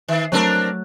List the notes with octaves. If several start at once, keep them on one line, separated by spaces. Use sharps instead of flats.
D#3
F#3 A3 C4 D4 A#4
F#6